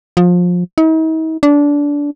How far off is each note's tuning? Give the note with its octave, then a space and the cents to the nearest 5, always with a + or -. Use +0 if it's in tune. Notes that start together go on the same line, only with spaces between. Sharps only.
F3 +25
D#4 +45
D4 -20